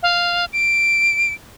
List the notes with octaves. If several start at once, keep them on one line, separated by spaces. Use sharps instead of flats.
F5
D7